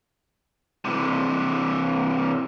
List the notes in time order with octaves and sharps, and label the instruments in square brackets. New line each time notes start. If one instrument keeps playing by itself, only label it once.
[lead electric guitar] C3 E3